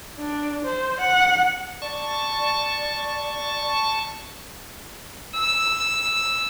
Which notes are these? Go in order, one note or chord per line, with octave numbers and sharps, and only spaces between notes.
D4
C5
F#5
D5 A5 C#6
E6